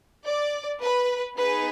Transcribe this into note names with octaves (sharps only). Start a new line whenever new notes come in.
D5
B4
B3 D#4 G#4 B4